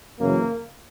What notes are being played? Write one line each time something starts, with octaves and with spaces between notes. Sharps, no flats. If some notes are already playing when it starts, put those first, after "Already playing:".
F#2 C#3 E3 A#3